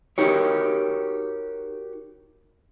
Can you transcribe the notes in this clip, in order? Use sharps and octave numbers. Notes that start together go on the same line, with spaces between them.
D#4 F#4 G4 A#4 C#5